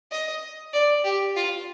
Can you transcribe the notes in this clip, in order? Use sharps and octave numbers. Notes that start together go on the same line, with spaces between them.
D#5
D5
G4
F4